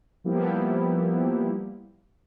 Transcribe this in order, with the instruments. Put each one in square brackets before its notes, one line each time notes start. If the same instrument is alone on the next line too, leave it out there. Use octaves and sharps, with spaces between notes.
[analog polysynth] F3 G3 A#3 B3 E4 G4